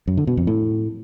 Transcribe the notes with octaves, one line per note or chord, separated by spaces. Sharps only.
F#2
D3
B2
F2
A2